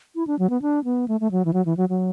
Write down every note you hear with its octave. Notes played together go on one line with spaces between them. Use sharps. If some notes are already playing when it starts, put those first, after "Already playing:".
E4
D4
F#3
B3
D4
B3
A3
A3
F#3
E3
F#3
E3
F#3
F#3